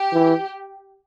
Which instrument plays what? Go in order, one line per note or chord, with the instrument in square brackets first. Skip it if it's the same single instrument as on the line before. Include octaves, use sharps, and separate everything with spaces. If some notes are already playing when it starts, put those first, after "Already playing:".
Already playing: [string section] G4
[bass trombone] E3